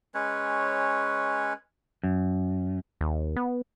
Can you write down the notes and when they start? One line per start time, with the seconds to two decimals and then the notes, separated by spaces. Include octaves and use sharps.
0.14 G#3 C#4 B4 C#5
2.03 F#2
3.01 D#2
3.36 B3